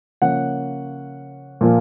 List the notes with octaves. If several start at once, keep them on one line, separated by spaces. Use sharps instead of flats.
C#3 F3 A#3 C#4 F#5
A#2 F3 A#3